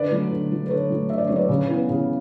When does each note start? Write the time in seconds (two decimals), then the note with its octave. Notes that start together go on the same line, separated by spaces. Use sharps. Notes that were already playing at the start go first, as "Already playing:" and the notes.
Already playing: D3 B4 D5
0.11 F#3 A3
0.31 D3
0.51 F#3 A3
0.66 B4
0.70 D3 A4 C#5
0.90 F#3 A3
1.10 D3 E5
1.18 D5
1.27 F#3 A3 C#5
1.36 B4 D5
1.49 C#3
1.69 E3 B3
1.89 C#3